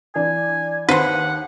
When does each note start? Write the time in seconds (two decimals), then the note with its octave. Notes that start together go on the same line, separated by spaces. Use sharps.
0.15 E3 D4 G#5
0.89 D#2 B4 C5 F#5